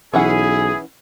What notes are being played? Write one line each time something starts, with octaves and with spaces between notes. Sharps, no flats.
B1 E3 C#4 E4 G#4 F#5